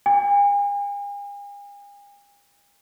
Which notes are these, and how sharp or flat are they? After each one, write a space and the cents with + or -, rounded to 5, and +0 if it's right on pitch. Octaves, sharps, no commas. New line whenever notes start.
G#5 -45